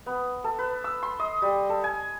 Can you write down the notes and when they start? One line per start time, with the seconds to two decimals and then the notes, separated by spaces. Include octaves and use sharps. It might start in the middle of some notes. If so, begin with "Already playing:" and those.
0.06 B3
0.44 A4
0.59 B4
0.84 E6
1.03 C6
1.20 D#5
1.42 G3
1.69 A4
1.84 G#5